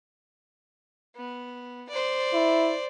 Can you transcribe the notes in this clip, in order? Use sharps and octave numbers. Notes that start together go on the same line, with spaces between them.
B3
C5 D5
E4